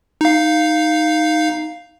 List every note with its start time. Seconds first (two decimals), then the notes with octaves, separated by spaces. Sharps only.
0.21 D#4 F5